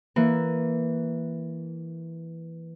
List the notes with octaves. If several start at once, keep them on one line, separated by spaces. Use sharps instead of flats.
E3 A#3